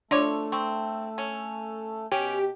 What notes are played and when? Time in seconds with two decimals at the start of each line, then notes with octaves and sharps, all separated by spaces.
0.11 F3 A3 D4 A4 C#5 D5 D6
0.52 C4 C#6
1.18 C#4
2.12 B2 C#4 G4 G5